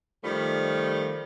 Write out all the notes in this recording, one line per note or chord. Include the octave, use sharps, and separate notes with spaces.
D#3 F3 G3 A3